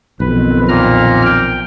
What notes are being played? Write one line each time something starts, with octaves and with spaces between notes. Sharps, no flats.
B1 F2 D#3 C4 B4
A#2 A#5 F6
G5